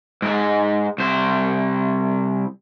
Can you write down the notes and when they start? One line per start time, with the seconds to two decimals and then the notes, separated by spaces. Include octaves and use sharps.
0.22 G#2 G#3
0.98 C2 C5